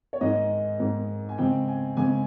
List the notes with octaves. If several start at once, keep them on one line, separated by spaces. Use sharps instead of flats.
C#5
G#2 D#3 G#3 D#5
G#2 D#3 G#3
G#5
C#3 G#3 C4 G5
G#5
C#3 G#3 C4 G#5